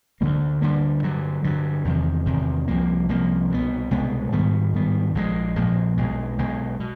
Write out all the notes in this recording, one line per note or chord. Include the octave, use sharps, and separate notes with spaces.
D2 D3 G3 A#3
D2 D3 G3 A#3
G2 D3 F#3
G2 D3 F#3
E2 C3 D#3
E2 C3 D#3
C2 C3 F3 A#3
C2 C3 F3 A#3
C2 B2 G#3 B3
C2 B2 G#3 B3
G#2 D#3 G3 B3
G#2 D#3 G3 B3
A#1 A#2 F3 G#3
A#1 A#2 F3 G#3
B1 B2 G#3
B1 B2 G#3
B2